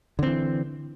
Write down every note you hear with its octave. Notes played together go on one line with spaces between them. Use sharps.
D3 E3 C4